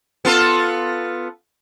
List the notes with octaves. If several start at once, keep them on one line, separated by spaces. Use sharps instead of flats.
B3 F4 A4